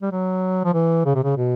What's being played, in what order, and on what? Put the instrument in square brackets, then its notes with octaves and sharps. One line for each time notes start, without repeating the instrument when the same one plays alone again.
[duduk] G3
F#3
F3
E3
C#3
C3
C#3
B2